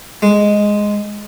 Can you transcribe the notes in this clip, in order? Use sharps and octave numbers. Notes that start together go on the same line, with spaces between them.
G#3